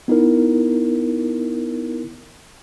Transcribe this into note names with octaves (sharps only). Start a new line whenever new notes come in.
B3 D#4 E4 A#4